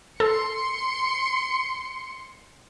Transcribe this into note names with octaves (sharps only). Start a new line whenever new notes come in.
A4 C6 C#7